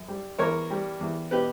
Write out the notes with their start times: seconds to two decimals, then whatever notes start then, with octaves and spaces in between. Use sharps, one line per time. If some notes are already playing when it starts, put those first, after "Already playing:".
Already playing: F#2
0.08 G3
0.39 E2 A#4 C#5
0.70 G3
1.01 E2
1.31 B2 G4 B4